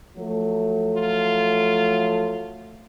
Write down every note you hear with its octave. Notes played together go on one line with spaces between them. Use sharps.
F3 F#3 A3
F4